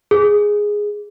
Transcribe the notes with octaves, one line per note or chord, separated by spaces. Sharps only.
G#4